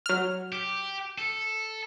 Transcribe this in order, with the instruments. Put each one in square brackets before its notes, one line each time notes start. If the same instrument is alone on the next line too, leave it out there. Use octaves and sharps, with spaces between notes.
[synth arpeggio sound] F#3 F6
[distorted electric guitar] G4
A4